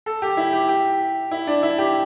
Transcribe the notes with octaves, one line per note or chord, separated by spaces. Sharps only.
A4
G4
E4
G4
G4
E4
D4
E4
G4